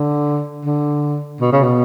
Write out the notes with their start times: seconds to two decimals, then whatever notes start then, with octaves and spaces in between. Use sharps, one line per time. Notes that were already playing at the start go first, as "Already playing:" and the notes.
Already playing: D3
0.65 D3
1.41 B2
1.52 C#3
1.64 B2